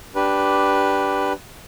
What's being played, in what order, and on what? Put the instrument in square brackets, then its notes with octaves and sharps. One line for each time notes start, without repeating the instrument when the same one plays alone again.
[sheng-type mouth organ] D4 G4 B4